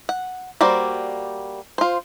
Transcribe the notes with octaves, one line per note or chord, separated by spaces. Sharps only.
F#5
G3 A#3 F#4 C5 D5
F4 C5